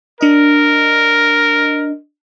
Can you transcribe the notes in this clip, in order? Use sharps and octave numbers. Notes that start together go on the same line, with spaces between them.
D4 A#4 D#5